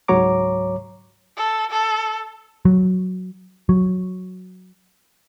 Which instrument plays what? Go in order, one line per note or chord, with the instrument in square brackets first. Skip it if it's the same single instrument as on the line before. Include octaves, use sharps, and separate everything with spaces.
[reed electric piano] C#2 G#2 F#3 C#5 A#5 D6
[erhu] A4
A4
[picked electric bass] F#3
F#3